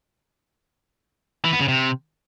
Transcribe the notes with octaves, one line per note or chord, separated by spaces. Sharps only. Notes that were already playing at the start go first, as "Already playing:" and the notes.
E3
B3
C#3
C3